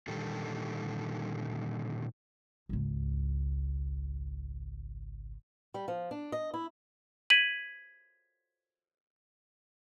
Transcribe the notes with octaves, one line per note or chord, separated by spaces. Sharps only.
A#2 D3 D#3 G3 G4 A4
G#1 C#2
G3
F3
D4
D#5
E4
G#6 B6 D#7 F#7